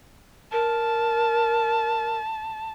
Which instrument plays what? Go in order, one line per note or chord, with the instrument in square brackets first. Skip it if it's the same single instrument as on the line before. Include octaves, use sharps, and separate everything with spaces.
[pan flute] A#4 [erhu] A5